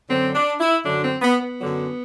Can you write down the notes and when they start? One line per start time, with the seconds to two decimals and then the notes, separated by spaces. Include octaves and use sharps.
0.08 F#2 D3 F#3 C4
0.34 D4
0.59 E4
0.84 F#2 D3 F#3 D4
1.02 C4
1.21 B3
1.40 B3
1.59 F#2 D3 F#3